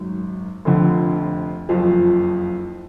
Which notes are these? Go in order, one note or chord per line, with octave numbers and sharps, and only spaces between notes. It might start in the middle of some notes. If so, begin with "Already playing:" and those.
Already playing: G#1 F#2 D#3
F1 F2 D3
F#1 F2 F3